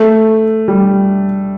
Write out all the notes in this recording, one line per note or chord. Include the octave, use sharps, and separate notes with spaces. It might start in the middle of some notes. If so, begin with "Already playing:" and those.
Already playing: A3
G3